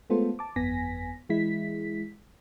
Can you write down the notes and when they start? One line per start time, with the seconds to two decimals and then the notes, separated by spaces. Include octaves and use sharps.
0.10 G#3 A3 B3 F4 A4 C5
0.39 A5 D6
0.56 G1 F2 B3 G#5 A#6 B6
1.29 E3 G#3 E4 B6